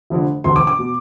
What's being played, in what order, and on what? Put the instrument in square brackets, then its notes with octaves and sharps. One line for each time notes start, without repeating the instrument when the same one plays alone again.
[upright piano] F1 F2 D3
E1 D2 C3 E3 C6
D6
D6
B2